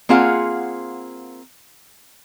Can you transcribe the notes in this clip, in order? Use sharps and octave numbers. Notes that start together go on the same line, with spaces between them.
A#3 C4 F4 G#4 F5 F#5